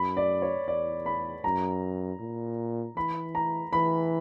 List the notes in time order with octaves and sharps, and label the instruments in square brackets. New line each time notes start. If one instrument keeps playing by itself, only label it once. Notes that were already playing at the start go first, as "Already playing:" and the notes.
Already playing: [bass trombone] F#2 [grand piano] B5
[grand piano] D5
C#5
[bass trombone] E2 [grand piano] D5
[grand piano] B5
[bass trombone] F#2 [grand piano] A#5
[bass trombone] A#2
[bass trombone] E3 [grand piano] B5
[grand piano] A#5
[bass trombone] E3 [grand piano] B5